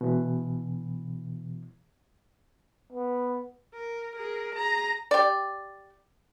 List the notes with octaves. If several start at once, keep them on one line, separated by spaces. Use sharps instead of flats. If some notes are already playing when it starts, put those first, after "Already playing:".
B2 E3
B3
A#4
G#4 A#4
G#4 A#5
G4 D5